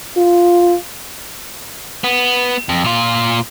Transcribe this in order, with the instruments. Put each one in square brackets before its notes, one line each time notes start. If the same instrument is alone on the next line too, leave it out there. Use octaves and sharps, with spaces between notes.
[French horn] F4
[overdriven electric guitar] B3
F2
A#2 F4